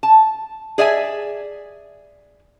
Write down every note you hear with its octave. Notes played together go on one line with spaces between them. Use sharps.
A5
G#4 D5 E5 G#5